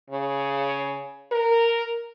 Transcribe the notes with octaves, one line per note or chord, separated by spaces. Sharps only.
C#3
A#4